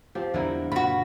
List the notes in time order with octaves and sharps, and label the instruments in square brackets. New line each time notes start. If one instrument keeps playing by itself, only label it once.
[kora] F3 C4 G4
[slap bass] E2 E3 G3 [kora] D3 E4 A#4
[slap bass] F#2 A#2 C#3 [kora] F4 [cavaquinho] F#4 B5